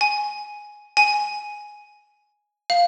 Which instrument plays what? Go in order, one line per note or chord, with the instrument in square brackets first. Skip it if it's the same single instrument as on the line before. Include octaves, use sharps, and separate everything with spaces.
[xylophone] G#5
G#5
F5